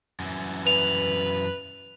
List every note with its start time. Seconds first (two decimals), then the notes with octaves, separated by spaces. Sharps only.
0.20 F#2 E3
0.67 B4 F7